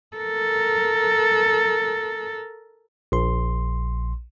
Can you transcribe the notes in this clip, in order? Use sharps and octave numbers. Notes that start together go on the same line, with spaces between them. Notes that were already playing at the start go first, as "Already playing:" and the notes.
A4 A#4
A#1 C6